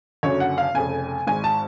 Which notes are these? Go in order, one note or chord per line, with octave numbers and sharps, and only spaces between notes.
F#1 F#2 D3 C#5
F#5
F5
F1 F2 C#3 G#5
G#1 G#2 G#5
A5